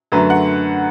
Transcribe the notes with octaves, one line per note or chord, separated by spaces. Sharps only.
F#2 D3 F#3 A3 B4
F#5